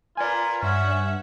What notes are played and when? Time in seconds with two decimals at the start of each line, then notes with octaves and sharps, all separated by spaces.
0.17 F4 A#4 B4 D5 G#5
0.62 G2 C#4 E5 F#5